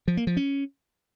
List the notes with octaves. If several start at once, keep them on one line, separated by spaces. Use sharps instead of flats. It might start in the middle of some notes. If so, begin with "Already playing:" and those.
F3
A#3
F3
C#4